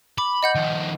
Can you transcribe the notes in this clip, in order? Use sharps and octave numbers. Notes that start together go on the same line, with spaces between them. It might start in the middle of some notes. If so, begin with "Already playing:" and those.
B5 D6
D#5 F#5 G6
D#3 F3